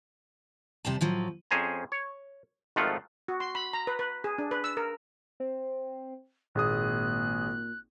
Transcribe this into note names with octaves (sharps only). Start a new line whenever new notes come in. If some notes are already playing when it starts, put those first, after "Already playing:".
C3 G3 C5 A5
A2 F3 F#3
F2 C#4 G#4 C5 G#5 A#5
C#5
G#1 D#3 F3 A3 F4 F#5
F#4
C6
B5
A#5
B4
B4
G#4
D4
B4
E6
A#4
C4
G#1 A#2 G#4 D#6 F#6